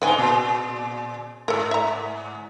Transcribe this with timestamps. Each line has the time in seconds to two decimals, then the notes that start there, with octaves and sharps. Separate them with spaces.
0.02 G#2 D#4 B4 G5 G#5
0.18 A#2
1.48 G#2 A4 A#4
1.71 E5 A#5